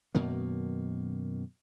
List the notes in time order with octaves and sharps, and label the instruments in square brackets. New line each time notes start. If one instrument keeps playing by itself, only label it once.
[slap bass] F#2 B2 D#3 A#3